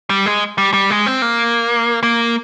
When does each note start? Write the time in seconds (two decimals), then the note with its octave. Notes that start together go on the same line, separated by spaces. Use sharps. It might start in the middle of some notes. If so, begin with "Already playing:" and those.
0.10 G3
0.26 G#3
0.58 G3
0.73 G3
0.90 G#3
1.06 C4
1.22 A#3
2.03 A#3